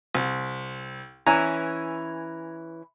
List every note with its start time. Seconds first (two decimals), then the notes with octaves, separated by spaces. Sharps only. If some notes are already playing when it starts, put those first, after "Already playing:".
0.15 C2
1.26 E3 C#4 E4 G#5 A#5